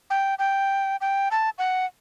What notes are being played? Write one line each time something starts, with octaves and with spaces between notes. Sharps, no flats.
G5
G5
G5
A5
F#5